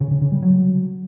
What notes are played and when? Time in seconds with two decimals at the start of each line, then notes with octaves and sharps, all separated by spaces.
0.01 C#3
0.11 C#3
0.22 C#3
0.32 G3
0.42 F#3